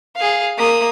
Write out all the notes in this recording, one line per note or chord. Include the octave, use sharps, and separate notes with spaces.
G#4 F5
A#3 D#6